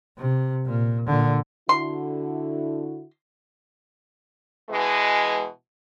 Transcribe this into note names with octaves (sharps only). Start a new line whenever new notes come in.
C3
A#2
A#2 D3
D3 E4 F#4 C6
B2 E3 G#3